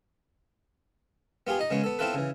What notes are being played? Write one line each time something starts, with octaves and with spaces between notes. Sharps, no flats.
B3 F4 G4 G#4
D#4 D#5
C#3 G#3 B3 C#4
B3 A4
B3 C4 E4 F4 A4 B4
C#3 E3